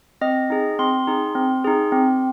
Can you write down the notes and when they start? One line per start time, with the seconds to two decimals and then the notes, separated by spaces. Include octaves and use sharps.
0.21 C4 D#5
0.50 D#4 G#4
0.79 C4 C6
1.07 D#4 G#4
1.35 C4
1.64 D#4 G#4
1.92 C4